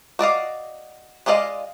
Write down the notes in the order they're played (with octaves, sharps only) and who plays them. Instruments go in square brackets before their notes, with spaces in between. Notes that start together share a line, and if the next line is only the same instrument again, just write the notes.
[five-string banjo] F#4 D5 D#5 F5
G#3 F4 D5 D#5 F5